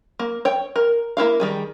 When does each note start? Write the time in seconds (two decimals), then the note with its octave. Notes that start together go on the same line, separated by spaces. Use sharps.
0.19 A#3
0.45 C#5 G5
0.76 A#4
1.17 A#3 E4 A#4 F5
1.40 D#3 G3 G#4